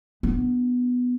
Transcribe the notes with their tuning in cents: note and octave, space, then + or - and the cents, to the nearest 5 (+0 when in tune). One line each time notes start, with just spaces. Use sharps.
B3 +0 D4 +15